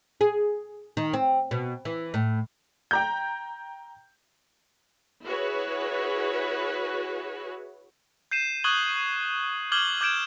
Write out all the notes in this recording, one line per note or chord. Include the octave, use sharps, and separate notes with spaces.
G#4
D#3
C4
B2
E3
A2
G5 A#5 G6
E4 F#4 G#4 B4 C#5
G6 C7 D#7 E7
C#6 D#6 F#6 G#6 F#7 G7
D6 F6 G6 G#6 F#7 G7
D6 G6 G#6 D7 E7